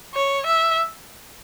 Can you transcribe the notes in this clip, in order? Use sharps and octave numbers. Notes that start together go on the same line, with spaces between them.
C#5
E5